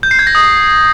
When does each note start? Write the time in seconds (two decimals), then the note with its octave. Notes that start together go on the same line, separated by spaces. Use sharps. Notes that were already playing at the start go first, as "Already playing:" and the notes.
0.03 G6
0.11 C7
0.19 G#6
0.27 A#6
0.35 D#6